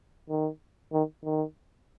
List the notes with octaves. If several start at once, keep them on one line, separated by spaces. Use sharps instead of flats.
D#3
D#3
D#3